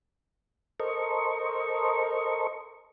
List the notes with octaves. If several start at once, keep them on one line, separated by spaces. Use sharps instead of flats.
A4 A#4 C5 D#5 C#6